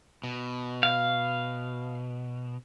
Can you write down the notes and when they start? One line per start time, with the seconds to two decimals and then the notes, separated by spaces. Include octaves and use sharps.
0.24 B2
0.83 F5